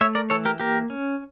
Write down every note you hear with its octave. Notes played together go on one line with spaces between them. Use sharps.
A3 C#5 E5
A#4 D5
E3 A4 C#5
G4 A#4
A#3 G4 A#4
C#4